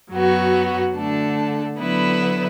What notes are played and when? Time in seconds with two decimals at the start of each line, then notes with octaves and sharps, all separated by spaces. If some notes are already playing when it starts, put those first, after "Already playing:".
0.11 F#2 F#3 B3 F#4
0.95 D3 A3 D4 A4
1.77 D3 F#3 B3 E4 B4